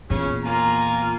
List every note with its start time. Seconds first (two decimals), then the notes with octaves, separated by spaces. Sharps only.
0.10 E2 A#2 C#3 C#4
0.44 A#3 F4 G#5 A#5